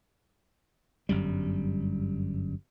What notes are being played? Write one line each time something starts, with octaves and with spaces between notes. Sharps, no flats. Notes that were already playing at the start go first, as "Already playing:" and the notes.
G1 F#2 G3